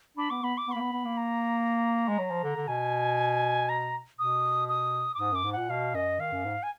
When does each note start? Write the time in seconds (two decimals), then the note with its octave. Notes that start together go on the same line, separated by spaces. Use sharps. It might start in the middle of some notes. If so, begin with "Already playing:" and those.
0.17 D4 B5
0.30 B3 D6
0.42 B3 B5
0.58 D6
0.68 B3
0.72 A#3 B5
0.80 B3
0.93 B3
1.05 A#3
1.17 A#5
2.08 G#3
2.18 F#3
2.30 F3
2.43 D3
2.56 D3
2.68 B2 G#5
3.69 A#5
4.19 B2 D#6
4.69 D#6
5.15 D6
5.19 G#2 D#6
5.32 F#2 D6
5.44 G#2
5.53 A#2 F#5
5.69 B2 F5
5.94 F#2 D#5
6.19 D#3 F5
6.32 F#2
6.45 G#2
6.63 G#5